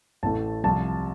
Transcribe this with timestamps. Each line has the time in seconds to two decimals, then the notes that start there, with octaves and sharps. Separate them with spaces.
0.23 A1 A2 A3 A5
0.64 C2 C3 F3 A5